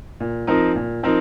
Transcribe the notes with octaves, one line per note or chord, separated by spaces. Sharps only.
A#2
F3 C4 D#4 A#4
A#2
F3 C4 D#4 A#4